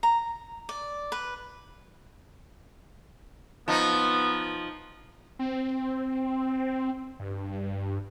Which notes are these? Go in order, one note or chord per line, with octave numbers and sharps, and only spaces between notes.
A#5
D5
B4
F3 B3 D#4
C4
G2